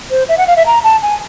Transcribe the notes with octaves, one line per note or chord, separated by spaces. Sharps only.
C5
E5
F#5
F5
E5
A#5
A5
G#5